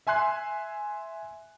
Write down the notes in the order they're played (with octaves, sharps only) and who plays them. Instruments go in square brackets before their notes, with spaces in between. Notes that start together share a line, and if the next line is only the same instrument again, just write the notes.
[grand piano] E5 G#5 C6 F#6 C7